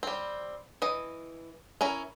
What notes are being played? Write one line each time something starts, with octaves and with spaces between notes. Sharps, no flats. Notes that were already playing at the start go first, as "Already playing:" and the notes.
G3 C4
E3 D#5
C#4 E4 A#4